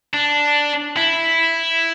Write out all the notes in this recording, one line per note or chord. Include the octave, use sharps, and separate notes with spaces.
D4
E4